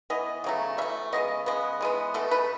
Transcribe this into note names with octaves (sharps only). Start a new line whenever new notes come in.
E3 B3 D#5
C#3 F#3 A3
E3 A3 E5
C#3 G#3 B3 D#5
C#3 G#3 B3
E3 G#3 B3
B2 A3 A4
B4